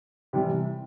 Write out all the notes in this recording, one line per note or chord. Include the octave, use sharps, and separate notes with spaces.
C3 E3 G3